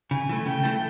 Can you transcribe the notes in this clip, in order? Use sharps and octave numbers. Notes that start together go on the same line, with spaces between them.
C#3 G#5
E3 A3
C#3 G5
E3 A3